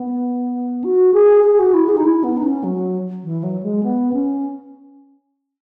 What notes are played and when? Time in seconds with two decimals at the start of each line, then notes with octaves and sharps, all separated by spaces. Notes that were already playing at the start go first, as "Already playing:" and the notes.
Already playing: B3
0.84 F#4
1.14 G#4
1.44 G#4
1.59 F#4
1.74 E4
1.89 G#4
1.97 D#4
2.04 E4
2.24 B3
2.37 D#4
2.43 C#4
2.64 F#3
3.24 E3
3.43 F#3
3.63 G#3
3.83 B3
4.13 C#4